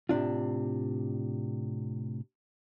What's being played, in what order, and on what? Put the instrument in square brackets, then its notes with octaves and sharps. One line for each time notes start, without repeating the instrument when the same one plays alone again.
[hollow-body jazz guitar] A2 C3 D4 F4